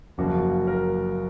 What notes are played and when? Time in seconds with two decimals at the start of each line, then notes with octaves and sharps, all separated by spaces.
0.18 F#1 F#2 C#3 F3 A#3 F#4
0.67 A#4